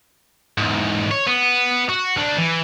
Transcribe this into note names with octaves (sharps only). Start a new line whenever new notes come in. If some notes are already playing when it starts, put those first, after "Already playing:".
E2 G#2
C#5
B3
F#4
D2 D4
E3